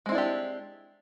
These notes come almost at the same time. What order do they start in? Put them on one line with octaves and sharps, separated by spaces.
G#3 C4 E4 D4 G4